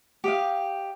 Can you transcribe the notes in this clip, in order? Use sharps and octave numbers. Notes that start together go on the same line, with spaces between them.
G4 D#5 F5